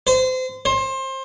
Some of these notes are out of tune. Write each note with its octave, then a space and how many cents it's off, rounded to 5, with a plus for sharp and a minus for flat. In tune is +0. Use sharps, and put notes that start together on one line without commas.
C5 -30
C5 +25